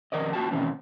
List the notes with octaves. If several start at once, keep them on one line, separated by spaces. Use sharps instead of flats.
F2 B2 D#3 A#4 D5 D#5
A#3 F4 F#4 G5 A5
B2 D#3 E3 A#3 C4 C#4